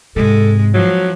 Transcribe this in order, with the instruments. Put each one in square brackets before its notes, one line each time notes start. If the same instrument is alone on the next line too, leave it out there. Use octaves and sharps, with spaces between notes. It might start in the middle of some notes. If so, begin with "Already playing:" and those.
[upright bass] G#2 C3 [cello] G#3 [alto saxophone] A4
[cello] F3 [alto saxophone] F#3